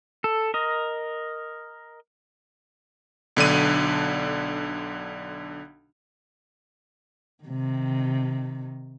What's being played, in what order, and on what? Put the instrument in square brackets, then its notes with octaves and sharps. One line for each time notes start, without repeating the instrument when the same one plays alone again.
[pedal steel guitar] A4
A#4 D#5
[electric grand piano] B1 D3 D4 D#7
[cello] C3 D#3